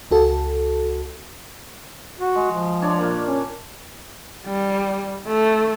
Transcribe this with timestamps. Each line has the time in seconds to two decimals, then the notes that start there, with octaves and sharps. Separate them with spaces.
0.11 C#2 F#4 A4
2.19 F#4
2.35 G#3
2.51 F3
2.82 D4 C#5 D5
2.98 A#2 A#3
3.28 C#4
4.46 G3
5.27 A3